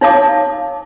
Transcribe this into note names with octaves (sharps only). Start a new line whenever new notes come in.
D#4 C#5 F5 A5 D6